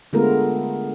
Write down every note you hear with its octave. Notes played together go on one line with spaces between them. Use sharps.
D3 G#3 A3 B3 F4 A#4